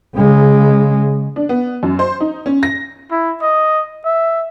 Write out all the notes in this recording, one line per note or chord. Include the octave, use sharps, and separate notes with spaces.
C#3 G#3
D4
B3
F#2
C5
D#4
C#4
A#6
E4
D#5
E5